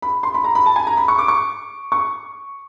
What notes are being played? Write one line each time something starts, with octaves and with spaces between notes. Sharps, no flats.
B5
C6
B5
A#5
B5
A5
G#5
A#5
B5
C#6
D6
C#6
C#6